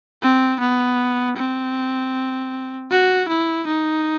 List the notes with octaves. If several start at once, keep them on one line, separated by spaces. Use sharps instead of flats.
C4
B3
C4
F#4
E4
D#4